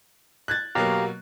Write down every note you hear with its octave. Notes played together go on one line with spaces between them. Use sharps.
F#6 G#6 A6
B2 F#3 A#3 G4 F5 A#5